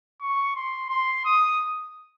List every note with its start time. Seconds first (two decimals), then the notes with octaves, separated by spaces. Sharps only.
0.21 C#6
0.56 C6
0.90 C6
1.25 D#6